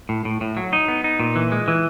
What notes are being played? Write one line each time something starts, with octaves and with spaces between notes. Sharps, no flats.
A2
A2
A2
F#3
D#4
B3
D#4
A#2
E3
G#3
E3